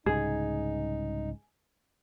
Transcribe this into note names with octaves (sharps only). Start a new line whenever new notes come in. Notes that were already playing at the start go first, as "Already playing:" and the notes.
C2 G#2 C#3 D#4 G#4